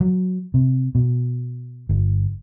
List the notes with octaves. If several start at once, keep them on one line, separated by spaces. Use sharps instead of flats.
F#3
C3
B2
G1